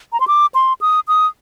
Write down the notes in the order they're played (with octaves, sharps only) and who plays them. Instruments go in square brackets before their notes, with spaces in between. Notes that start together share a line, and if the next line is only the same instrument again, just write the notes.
[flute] A#5
C6
D6
C6
D#6
D#6